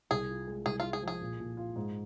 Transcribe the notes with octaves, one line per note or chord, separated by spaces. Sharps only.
C2 G#4
F4
G#3
C2 G#4
F4
G#3
G#4
F3
G#4
A#2
A#2
F4
G#2